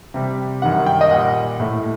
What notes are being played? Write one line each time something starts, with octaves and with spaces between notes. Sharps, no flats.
C3 G3
F#2 D#3 G3 F#5
G5
D#5
A#2 G3 F#5
A2 A3